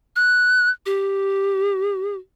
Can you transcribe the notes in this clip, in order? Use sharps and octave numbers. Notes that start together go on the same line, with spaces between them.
F#6
G4